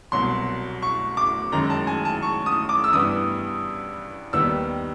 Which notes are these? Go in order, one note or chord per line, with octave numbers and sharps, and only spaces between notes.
C2 B2 F#3 C6
C#6
D6
F#2 D#3 G#3 A#5
A5
G#5
A5
C#6
D#6
D6
E6
G2 E3 G3 B3 D#6
D#2 D#3 G3 B3 E6